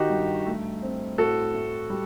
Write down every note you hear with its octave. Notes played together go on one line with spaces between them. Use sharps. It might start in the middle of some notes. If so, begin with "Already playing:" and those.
Already playing: D#3 D#4 F#4 G4
G2
A3
C4
A2 F#4 A4
A2
G3